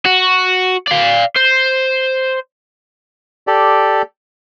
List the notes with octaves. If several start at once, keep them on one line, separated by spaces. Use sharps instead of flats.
F#4
D5 F5
C5
G4 A4 D5